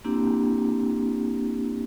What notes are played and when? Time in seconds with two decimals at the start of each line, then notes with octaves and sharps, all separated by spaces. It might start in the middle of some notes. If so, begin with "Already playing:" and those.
0.04 A#3 C4 D4 E4 G4